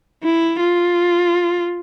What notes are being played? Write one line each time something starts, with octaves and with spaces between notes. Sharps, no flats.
E4
F4